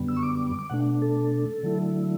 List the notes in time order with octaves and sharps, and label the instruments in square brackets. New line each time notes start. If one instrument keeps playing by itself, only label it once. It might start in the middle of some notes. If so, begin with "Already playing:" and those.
Already playing: [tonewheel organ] F#2 D3 G3 B3
E6
C#6
D6
D6
D6
D6
B2 A3 D4 F#5
A4
D3 F#3 A3 E4